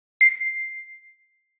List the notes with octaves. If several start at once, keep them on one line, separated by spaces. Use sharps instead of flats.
C7